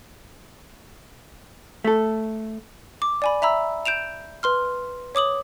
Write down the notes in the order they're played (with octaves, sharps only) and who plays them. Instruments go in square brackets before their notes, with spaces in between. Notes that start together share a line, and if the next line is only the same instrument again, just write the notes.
[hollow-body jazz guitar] A3 A4
[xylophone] D6
D5 G#5 B5
E5 A#5 B5 E6
G6 D7 E7 F7
B4 C6 F6
C#5 D6 D#6 F#7